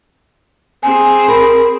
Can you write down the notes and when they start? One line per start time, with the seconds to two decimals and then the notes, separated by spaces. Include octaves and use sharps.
0.83 C4 G#4 G#5
1.28 A#4 B5